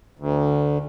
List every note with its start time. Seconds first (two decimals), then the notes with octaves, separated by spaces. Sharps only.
0.19 D2